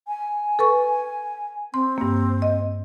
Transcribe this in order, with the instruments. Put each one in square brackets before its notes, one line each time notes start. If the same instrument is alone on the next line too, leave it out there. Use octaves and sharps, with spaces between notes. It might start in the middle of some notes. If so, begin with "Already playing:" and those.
[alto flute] G#5
[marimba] A4 B4 C#6
[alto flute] C4 [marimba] C6
[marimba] G2 A#3
D#5